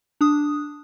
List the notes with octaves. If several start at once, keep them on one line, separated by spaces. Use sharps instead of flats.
D4 D#6